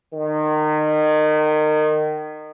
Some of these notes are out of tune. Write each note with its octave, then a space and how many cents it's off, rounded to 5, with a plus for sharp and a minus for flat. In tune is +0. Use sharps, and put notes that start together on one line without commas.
D#3 -25